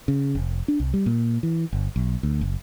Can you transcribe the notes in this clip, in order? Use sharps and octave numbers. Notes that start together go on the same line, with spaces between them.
C#3
F1
D4
C2
G3
A#2
E3
G1
B1
D2
F#1